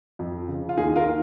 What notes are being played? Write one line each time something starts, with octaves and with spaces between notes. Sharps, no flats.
F2
C#3 F3
F4
D#2 D#4 G#4
F4 A#4
D#3